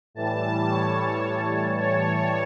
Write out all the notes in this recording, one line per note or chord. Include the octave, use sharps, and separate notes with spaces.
A2 E3 G3 A5
C#5
C#5